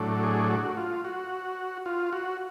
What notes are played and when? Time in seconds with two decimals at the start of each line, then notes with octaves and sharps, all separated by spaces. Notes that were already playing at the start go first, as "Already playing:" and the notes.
Already playing: A2 F#3 A3 D4
0.23 G#4
0.50 F#4
0.77 F4
1.05 F#4
1.86 F4
2.13 F#4